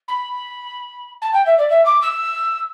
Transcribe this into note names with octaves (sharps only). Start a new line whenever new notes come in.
B5
A5
G5
E5
D5
E5
D6
E6